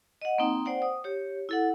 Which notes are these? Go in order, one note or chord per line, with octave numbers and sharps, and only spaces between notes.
D#5 F#5
A#3 C4 D#4 G5
C5 D5 F#5 G5
D#6
G4 C#5
E4 A4 F#5